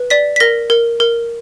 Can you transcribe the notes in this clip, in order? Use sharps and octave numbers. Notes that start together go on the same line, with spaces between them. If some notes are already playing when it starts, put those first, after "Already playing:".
Already playing: B4
D5 B6
B6
A#4 A#6
A#4
A#4